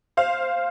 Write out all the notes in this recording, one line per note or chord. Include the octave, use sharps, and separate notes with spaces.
C5 F5